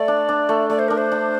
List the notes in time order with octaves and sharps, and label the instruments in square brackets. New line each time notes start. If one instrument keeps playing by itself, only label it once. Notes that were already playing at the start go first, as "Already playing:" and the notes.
Already playing: [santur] A3 [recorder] D5
[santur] D4
D4
A3
[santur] A3 [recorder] D5
[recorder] C5
[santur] D4 [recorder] A#4
[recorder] C5
[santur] D4